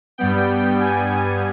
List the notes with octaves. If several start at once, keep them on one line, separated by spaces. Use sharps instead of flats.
G2 G3 B3 G5
G#5
G#5